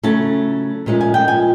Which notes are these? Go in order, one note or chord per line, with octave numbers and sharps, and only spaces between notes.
C#3 F#3 A3 C#4 E4 A5
A#2 F3 G#3 C#4 E4
G#5
G5
G#5